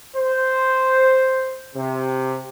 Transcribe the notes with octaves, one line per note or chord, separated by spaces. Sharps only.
C5
C3